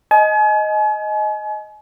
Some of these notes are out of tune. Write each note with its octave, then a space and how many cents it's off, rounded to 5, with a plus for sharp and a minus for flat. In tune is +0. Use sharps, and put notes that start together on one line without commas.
D#5 +5 G#5 +40